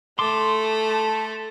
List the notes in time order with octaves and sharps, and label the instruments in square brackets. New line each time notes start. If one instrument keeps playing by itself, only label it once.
[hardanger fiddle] A3 A4 [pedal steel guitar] C6 D6